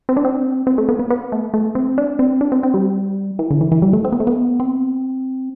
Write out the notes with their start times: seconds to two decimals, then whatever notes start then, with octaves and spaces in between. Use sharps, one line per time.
0.09 C4
0.17 D4
0.25 C4
0.67 C4
0.78 A3
0.89 B3
0.99 B3
1.10 B3
1.32 A3
1.54 A3
1.75 C4
1.98 D4
2.19 C4
2.41 D4
2.52 C4
2.63 C4
2.74 G3
3.39 E3
3.50 D3
3.61 E3
3.72 E3
3.82 G3
3.93 A3
4.04 C4
4.12 B3
4.20 A3
4.27 B3
4.60 C4